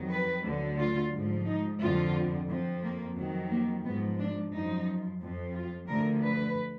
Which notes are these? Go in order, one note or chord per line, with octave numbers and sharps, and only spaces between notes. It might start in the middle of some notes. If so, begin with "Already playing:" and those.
Already playing: F2 D#3 F#3
B4
D2 D3 F#3
F4
G#2 F3
D#4
F2 D3 F3 F4
F2 F3
A#3
F2 D#3 F#3
A#3
G#2 F3 B3
D4
F#2 F3 D#4
F2 F3
F4
D2 D3 F3 A#4
B4